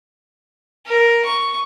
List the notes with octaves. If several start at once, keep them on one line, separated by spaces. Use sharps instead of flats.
A#4
C#6